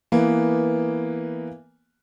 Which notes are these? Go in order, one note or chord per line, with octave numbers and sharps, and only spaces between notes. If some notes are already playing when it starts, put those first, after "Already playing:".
E3 A#3 B3